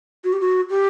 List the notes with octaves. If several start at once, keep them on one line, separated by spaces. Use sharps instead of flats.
F#4
G4
F#4
G4